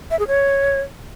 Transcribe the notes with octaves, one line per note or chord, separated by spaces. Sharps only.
E5
G#4
C#5